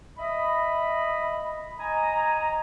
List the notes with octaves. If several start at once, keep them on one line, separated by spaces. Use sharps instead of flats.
D#5 E5 B5
D#5 G#5 A#5